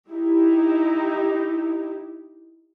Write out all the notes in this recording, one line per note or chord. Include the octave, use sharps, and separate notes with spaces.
D#4 E4 G4